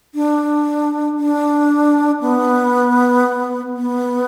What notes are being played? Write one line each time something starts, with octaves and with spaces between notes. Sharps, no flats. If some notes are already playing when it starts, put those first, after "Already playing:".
D4
D4
B3
B3